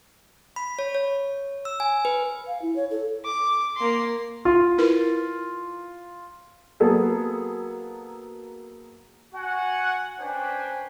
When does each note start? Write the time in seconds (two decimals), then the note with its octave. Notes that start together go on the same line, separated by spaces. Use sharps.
0.56 B5
0.79 C#5
0.95 C#5
1.65 E6
1.80 G#5
2.05 B4
2.47 F5
2.62 E4
2.76 C#5
2.91 A4
3.25 D6
3.77 A#3 C6
4.45 F4
4.78 E4 A#4 B4
6.80 F#3 A#3 B3 G#4 A4
9.35 F#4 F#5 G#5
10.19 C#4 D4 B4 C5 G5 G#5